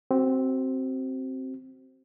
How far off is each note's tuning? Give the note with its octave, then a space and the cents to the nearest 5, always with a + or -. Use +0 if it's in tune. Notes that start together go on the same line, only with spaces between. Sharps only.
C4 +5 F#4 +35